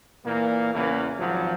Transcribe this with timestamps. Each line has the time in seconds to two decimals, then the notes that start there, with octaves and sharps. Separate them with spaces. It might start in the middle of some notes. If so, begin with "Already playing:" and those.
0.24 A#2 E3 A#3
0.73 E2 C#3 E3 A#3
1.18 G#1 F3 F#3